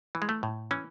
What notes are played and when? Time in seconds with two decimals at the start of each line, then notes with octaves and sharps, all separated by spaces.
0.15 E3
0.22 G#3
0.29 A3
0.43 A2
0.71 E3 C#4